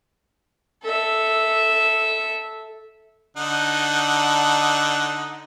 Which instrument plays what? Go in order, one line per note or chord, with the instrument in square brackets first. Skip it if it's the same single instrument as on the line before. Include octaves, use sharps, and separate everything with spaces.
[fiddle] A4 E5
[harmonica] D3 D#4 F#5